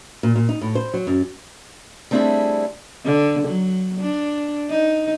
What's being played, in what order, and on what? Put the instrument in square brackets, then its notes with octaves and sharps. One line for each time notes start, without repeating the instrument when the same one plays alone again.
[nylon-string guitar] A#2
A#2
D#4
A2
C5
F#3
F#2
[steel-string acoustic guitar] G3 A3 C4 D4 E4 G#4
[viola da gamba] D3
F#3
D4
D#4